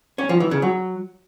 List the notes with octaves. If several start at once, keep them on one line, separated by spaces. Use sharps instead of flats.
C#4
F3
E3
C#3
F#3